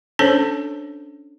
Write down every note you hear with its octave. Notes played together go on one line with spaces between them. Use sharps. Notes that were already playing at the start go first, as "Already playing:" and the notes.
C#4 D4 A4 C5 C#5